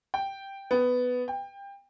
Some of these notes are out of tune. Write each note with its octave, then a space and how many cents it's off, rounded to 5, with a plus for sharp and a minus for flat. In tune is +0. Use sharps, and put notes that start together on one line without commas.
G5 +0
B3 +10
G5 +25